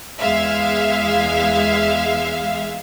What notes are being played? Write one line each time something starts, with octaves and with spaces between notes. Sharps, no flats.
E2 G#3 E5 F5